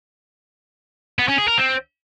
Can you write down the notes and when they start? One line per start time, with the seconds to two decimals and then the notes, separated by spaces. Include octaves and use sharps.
1.19 B3
1.28 C#4
1.38 G#4
1.48 A#4
1.58 C4